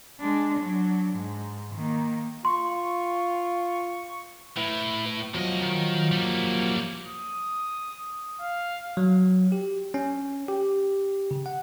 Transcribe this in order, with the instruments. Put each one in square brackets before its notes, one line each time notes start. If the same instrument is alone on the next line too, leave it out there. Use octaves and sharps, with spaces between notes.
[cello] G#3 D4
F#3 D4
G#2
D#3 A#3
[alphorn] F4 [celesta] C6 [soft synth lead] C#6
[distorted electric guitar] A2 [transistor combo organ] E4 B4
[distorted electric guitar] E2 D#5 [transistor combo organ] F3 F#3
[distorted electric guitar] D#3
G3 A#3
[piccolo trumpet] D#6
F5
[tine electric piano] F#3
G4
C#4
G4
C#3
F#5